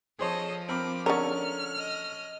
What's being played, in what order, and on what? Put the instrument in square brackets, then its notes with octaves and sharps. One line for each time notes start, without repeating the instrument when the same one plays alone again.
[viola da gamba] F3 [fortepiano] G#4 C5 C#5 [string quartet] A4 D#5
[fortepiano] C4 A#4 B5 [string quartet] D6
[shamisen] D3 A#4 [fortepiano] C#4 A4 C#6 [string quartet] F6
[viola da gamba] D#5